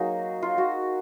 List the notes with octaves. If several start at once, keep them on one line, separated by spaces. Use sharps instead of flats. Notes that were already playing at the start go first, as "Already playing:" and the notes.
Already playing: F#3 A#3 D#4 F#4 G#4
F4
F#4